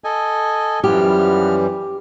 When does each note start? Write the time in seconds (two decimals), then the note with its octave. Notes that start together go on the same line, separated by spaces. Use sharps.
0.04 A4 D#5 G#5
0.84 F#2 E3 F3 G3 B3 G4 F6